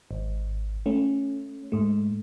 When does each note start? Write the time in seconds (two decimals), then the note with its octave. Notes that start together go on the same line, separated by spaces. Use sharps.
0.11 G#1
0.86 A3 C#4
1.72 G#2 A3